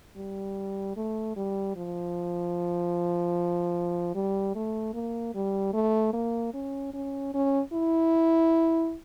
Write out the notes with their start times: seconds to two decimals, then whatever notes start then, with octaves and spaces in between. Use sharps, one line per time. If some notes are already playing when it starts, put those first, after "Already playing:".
0.16 G3
0.96 A3
1.36 G3
1.76 F3
4.15 G3
4.55 A3
4.94 A#3
5.34 G3
5.73 A3
6.13 A#3
6.54 C#4
6.93 C#4
7.34 C#4
7.73 E4